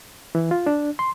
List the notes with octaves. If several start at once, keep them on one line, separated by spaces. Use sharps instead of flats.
E3
F4
D4
C6